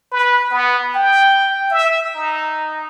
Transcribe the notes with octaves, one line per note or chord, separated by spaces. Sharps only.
B4
B3
G5
E5
D#4